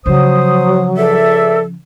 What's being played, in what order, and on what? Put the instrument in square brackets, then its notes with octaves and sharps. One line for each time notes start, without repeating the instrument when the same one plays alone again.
[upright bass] C#3 F3 [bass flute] F#3 [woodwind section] C5 D#6
[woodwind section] C#2 D5 E5 [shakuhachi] A4